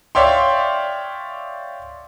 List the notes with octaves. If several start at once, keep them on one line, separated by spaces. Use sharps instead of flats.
C#5 D5 E5 F5 G5 C6